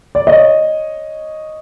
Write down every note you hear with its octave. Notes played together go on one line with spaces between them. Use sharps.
D5
C#5 D#5